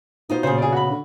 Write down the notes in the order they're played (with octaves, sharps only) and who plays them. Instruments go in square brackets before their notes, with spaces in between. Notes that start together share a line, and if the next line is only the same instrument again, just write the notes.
[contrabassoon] B2 [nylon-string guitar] D#4 F4 C5
[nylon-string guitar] A#2 C#3 [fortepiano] G#4 C5
[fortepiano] G#4 D5
F#4 B5
[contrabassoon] D3